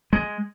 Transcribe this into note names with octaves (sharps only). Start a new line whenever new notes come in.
G#3